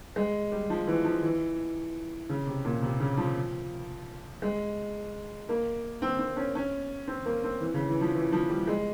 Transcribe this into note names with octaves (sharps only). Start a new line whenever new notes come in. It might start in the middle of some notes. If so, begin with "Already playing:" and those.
G#3
G3
F3
E3
F3
E3
C#3
C3
A#2
C3
C#3
F3
G#3
A#3
C4
C4
C#4
C#4
C4
A#3
C4
E3
C#3
E3
F3
E3
F3
G3
G#3